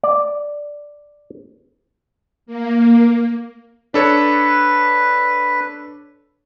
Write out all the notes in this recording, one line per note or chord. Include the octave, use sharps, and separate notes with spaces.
D5
A#3
D4 A4 B4 C#5